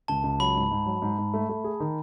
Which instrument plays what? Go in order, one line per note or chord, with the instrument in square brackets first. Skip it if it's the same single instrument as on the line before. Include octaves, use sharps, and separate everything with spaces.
[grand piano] C#2 [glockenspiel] A5
[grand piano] C#2
[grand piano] F#3 [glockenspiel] B5
[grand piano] G#2
G#2
F#3
G#2
G#2
A3
A3
G#4
D#3